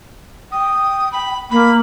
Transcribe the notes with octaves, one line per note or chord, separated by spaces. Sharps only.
G5 D#6
B5
A#3 B5